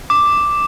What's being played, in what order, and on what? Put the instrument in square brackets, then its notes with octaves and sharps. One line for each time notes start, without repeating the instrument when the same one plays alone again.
[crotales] D6